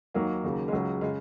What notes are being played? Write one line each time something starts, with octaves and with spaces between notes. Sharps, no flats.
D#2 D#3 F#3 A#3
D#2 C#3
G#3
C#2 C#3 F#3
C#3 G#3